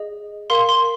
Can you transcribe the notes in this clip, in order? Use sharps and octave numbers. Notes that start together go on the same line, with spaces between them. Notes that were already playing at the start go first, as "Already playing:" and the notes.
Already playing: G#4 D#5
A#4 F5 C6
C6